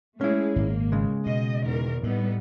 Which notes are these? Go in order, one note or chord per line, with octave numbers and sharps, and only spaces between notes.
G#3 A3 C#4 E4 G#4
G#1 A#2 A#3
C#3 G#3
B2 D#5
E2 D#3 A#4
A2 G3 B3 D#4